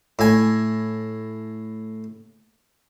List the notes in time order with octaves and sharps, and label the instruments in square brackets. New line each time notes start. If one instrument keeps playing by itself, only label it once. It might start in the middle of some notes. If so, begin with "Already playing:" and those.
[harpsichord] A2 G#5